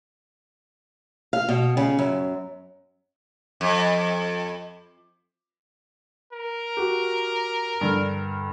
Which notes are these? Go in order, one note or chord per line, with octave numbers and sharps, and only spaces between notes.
F5
B2
C#3
F#2
F2
A#4
F#4 G4
G2 D3 F6